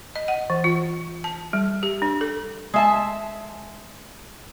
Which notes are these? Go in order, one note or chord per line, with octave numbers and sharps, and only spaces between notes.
D#5
F#5
E3
F4
A5
G3
G4
D4
A4
G#3 E5 A5